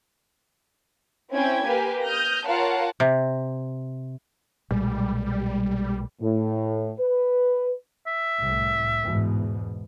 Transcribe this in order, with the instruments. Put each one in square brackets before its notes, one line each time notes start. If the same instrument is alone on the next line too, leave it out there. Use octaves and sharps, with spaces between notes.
[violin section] C4 C#4 E4 G5 G#6
A#3 G4 B4 G#5
D#6 F6 G6 A#6
F4 A#4 C#5 F5 F#5 A5
[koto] C3
[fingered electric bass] B1 A#2 G#3 [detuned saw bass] G3
[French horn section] A2
B4
[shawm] E5
[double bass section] C2 A2
E2 G#2 B2